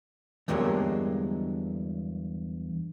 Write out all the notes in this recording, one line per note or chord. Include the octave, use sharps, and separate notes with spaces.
E2 G2 D3 F#3 G#3 A#3